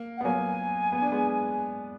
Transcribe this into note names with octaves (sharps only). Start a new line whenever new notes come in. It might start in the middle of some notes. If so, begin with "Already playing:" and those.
Already playing: A#3
F#5
B3
F#3 A#3 G#5
B3
D4
G#3 B3